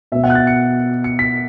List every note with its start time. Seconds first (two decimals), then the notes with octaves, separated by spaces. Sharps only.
0.12 B2 B3 E5
0.24 F#5
0.30 F#6
0.35 A6
0.47 C#7
1.04 C#7
1.19 B6